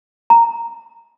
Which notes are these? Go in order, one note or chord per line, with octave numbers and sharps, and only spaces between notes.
A#5